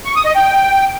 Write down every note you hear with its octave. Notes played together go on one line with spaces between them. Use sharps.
C#6
D#6
D#5
G5